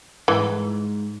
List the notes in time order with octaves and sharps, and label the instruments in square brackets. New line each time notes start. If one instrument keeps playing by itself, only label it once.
[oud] G#2 [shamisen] E3